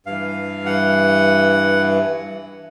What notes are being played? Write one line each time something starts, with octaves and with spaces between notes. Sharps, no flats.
G2 E3 F5
F#5